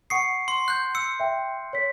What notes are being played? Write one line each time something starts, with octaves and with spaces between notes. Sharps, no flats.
F#5 C#6 D#6 C7 C#7
C6
F#6 G6
E6 C#7
E5 G5
C#5 B6